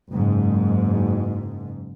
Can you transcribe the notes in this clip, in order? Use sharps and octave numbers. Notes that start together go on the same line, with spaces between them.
F#1 G#2